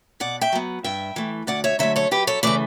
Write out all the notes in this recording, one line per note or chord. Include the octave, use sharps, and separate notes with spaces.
B2 D5 F#5
E5 G5
F#3 B3
G2 E5 G5
E3 A3
D2 D5 F#5
C#5 E5
D3 F#3 A3 C#5 E5
A4 C#5
F#2 G4 B4
A4 C#5
C#3 E3 A3 B4 D5